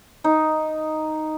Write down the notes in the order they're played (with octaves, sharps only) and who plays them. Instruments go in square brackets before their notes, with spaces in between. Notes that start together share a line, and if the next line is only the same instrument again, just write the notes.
[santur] D#4